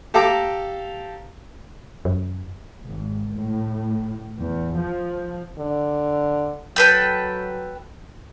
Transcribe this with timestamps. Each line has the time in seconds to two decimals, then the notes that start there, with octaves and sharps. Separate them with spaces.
0.14 G4 A4 F5 A#5 D6
2.05 F#2
2.85 G#1
3.35 A2
4.40 E2
4.75 F3
5.58 D3
6.76 F#3 A4 B4 G5